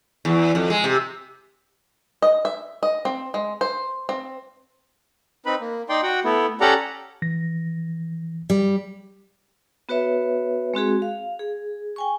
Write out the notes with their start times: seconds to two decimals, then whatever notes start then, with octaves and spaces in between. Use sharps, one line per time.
0.25 E2
0.55 F2
0.70 G#3
0.84 C3
2.22 D#5
2.45 E5
2.83 D#5
3.05 C4
3.34 G#3
3.61 C5
4.09 C4
5.46 C4 D#4 B4 B5
5.60 A#3
5.89 D#4 D5 G5 C6
6.03 F#4 F#5 G5
6.24 A3 B3 E4
6.61 C#4 G4 A4 D5 F#5 A#5
7.22 E3 A#6
8.50 G3
9.89 B3 F#4 B4 C#5 E5
10.74 G#3 C4 F#4 G#4
11.02 F5
11.39 G#4
11.96 G5 G#5 C#6